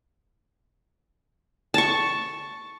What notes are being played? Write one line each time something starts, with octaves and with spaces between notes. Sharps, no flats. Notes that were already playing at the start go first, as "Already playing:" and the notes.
A5 C#6